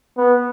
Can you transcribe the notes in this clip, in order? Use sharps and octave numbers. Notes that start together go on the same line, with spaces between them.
B3